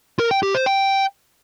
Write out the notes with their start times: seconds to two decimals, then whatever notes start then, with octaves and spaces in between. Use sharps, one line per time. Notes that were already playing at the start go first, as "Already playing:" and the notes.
0.19 A#4
0.31 G5
0.43 G4
0.54 C5
0.66 G5